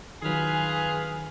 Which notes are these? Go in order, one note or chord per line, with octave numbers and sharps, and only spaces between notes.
D#3 F#3 F4 G#4 B4 G#5